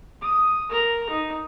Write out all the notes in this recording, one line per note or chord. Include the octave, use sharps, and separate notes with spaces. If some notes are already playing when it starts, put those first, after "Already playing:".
D#6
A#4 A#5
D#4